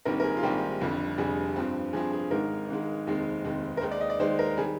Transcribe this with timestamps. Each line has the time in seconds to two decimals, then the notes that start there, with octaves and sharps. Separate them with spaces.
0.05 A#1 G#2 D#3 G3 C4 A#4
0.20 A#4
0.24 G#4
0.37 F4
0.42 A#1 G#2 D#3 G3 C4 G4
0.81 F1 F2 D3 G3
1.18 F1 F2 D3 G3 G#4
1.56 G2 F3 C4
1.93 G2 F3 C4 G#4
2.13 G#4
2.31 G#1 G#2 D#3 G#3 A#4
2.68 G#1 G#2 D#3 G#3
3.07 F1 D#2 D#3 G#3 C4
3.44 F1 D#2 D#3 G#3 C4
3.77 A#4
3.81 D#2 D#3 G#3 C5
3.91 D5
4.01 D#5
4.10 D5
4.19 D#2 D#3 G#3 C5
4.39 A#4
4.57 D#3 G3 G#4